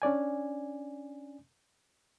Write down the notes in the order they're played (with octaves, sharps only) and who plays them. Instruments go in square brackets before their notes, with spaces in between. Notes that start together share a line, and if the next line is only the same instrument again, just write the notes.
[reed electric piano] C#4 D4 D5 G#5